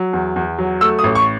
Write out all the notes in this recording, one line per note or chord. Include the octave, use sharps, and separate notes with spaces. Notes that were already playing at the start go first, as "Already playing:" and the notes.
Already playing: F#3
E2
E2
F#3
A3 E6
D#6
A1
C#6